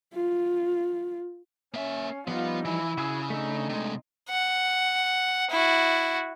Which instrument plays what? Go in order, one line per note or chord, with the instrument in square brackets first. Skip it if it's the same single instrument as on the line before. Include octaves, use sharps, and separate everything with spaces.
[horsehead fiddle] F4
[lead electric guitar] A#3 E5 [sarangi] C#4
[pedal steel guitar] F3 G3 D#4 [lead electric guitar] B3 [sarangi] F4
[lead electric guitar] E3 [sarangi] E4
[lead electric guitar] C#3 [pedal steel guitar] F#4 G#4 E6
[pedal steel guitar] A3 D4 E6 [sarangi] D#4
[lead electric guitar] C3 G#3
[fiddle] F#5
E4 F#4